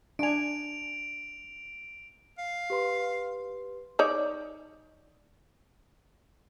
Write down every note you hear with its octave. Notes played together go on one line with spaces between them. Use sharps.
D4 G#5 D7 F7
F5
G4 B4 C6
D#4 C#5 D5